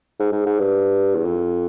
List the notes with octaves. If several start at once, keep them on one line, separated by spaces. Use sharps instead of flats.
G#2
G#2
G#2
G2
E2
F2